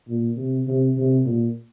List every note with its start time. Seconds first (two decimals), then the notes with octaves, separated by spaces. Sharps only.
0.08 A#2
0.37 C3
0.68 C3
0.97 C3
1.26 A#2